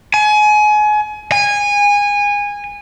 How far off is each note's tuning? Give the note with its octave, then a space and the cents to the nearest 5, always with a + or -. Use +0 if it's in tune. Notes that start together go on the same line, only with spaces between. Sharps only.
G#5 +30
G#5 -20